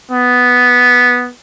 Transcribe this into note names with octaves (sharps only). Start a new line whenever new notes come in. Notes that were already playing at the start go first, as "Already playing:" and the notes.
B3